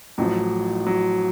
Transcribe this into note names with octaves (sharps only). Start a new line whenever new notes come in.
A1 A2 F3 F#3
F#3